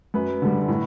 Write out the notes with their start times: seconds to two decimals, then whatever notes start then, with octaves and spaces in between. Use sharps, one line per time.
0.14 F#2 B4
0.42 D3 G3
0.68 A2